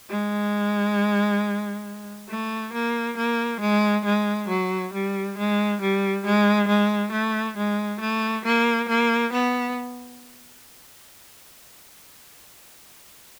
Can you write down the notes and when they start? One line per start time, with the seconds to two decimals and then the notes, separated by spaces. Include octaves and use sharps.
0.09 G#3
2.29 A3
2.73 A#3
3.17 A#3
3.60 G#3
4.05 G#3
4.48 F#3
4.93 G3
5.37 G#3
5.81 G3
6.25 G#3
6.68 G#3
7.12 A3
7.57 G#3
8.01 A3
8.45 A#3
8.88 A#3
9.33 B3